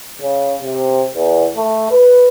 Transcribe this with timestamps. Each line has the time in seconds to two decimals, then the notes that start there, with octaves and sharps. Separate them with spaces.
0.21 C#3
0.62 C3
1.14 E2
1.55 A3
1.91 B4